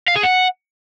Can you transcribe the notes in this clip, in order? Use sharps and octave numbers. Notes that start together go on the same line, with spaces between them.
F5
G#4
F#5